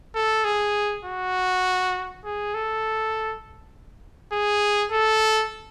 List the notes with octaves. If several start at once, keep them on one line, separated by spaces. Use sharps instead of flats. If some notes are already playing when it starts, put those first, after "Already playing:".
A4
G#4
F#4
G#4
A4
G#4
A4